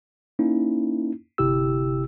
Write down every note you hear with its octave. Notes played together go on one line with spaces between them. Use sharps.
A#3 C#4 D#4 E4
G1 C3 E4 G4 E6